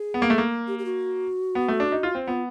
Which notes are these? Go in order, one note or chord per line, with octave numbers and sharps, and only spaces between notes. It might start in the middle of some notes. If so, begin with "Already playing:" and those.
Already playing: G#4
B3
A#3
A3
A#3
G4
G4
F#4
B3
A3
D4
D#4
F4
C4
B3 F4